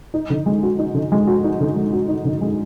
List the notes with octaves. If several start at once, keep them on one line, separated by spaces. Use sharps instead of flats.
D#4
D3
G#3
F#4
D#4
D3
G#3
F#4
D#4
D3
G#3
F#4
D#4
D3
G#3